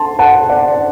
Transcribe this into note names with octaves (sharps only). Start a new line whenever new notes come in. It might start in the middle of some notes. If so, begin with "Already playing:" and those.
Already playing: A5 C6
F#5 A5
D5 F#5